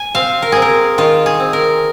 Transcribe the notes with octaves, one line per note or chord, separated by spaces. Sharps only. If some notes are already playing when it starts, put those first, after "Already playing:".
Already playing: G#5
C4 F5
A#4
C4 G#4
A#4
D#3 F4
G#4
C4
A#4